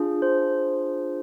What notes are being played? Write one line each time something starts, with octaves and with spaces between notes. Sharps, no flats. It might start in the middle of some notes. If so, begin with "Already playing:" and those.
Already playing: D4 F4 G#4
C5